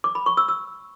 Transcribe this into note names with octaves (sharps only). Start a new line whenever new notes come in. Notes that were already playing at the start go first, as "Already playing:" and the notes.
D6
B5
C#6
E6
E6